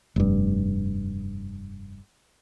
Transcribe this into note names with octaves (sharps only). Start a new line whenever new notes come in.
F1 G2